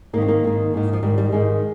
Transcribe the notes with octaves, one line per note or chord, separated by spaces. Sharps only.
G#2 D#3 A#3 C4
A#3
G#2 D#3
G#2 D#3
F3
G#2 D#3 G3
G3
G#2 D#3 G#3